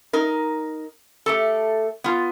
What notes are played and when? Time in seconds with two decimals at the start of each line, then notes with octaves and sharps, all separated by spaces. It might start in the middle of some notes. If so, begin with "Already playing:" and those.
0.13 D#4 A#4
1.26 A3 G4 A4
2.04 B3 F4